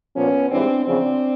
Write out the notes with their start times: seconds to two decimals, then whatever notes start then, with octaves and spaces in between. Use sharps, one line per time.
0.15 A#2 F3 B3 C#4
0.50 G#2 E3 G3 C4 D4
0.85 E2 C#3 F3 C4 D4